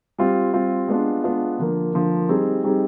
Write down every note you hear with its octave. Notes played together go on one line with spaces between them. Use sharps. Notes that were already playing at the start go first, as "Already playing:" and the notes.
G3 C4 F4
G3 C4 F4
G#3 B3 D4 F4
G#3 B3 D4 F4
D3 F3 A#3
D3 F3 A#3
G3 C4 D#4 G#4
G3 C4 D#4 G#4